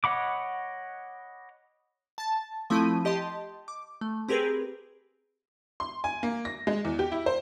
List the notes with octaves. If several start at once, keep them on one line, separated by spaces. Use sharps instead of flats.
C#5 D#5 F#5 B5 D6
A5 A6
F3 A3 C4 E4 B5 D#7
G4 D#5 A5 C6
D6
A3
C4 G4 G#4 A#4 B4
C6
G#5
A#3
A#6
G#3
E2
G4
E4
C5